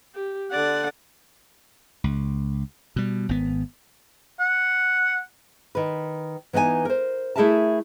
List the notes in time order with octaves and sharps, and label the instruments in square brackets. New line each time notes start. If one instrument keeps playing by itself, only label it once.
[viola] G4
[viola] D3 F#5 [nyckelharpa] D5
[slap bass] C#2
B2 G3
G#1 B3
[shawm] F#5
[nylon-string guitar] D#3 B4
E3 B3 D#4 D#5 G#5
A#4 C5
A3 E4 G#4 A#4 E5 A5